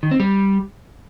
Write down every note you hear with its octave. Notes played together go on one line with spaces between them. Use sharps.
D#3
C4
G3